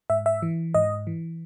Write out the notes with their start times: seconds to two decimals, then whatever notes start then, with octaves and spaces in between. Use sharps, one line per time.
0.10 G#2 E5
0.26 E5
0.42 E3
0.74 G#2 D#5
1.07 E3